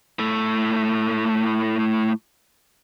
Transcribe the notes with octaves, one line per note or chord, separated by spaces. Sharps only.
A2 A3